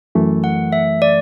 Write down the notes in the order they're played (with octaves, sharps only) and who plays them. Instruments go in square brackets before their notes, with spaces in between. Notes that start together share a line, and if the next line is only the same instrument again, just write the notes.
[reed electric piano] F#2 E3 A3
[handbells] F#5
E5
D5